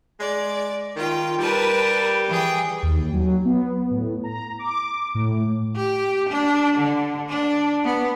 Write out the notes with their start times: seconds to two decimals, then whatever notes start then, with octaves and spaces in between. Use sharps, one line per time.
0.20 G#3 D5
0.96 D#3 F4 G5
1.39 G3 A#4 B4 A5
2.27 E3 G#4 G5
2.83 D#2
3.14 F#3
3.45 B3
3.91 A2
4.24 A#5
4.59 D6
5.15 A2
5.76 G4
6.29 D4
6.78 D3
7.29 D4
7.85 B3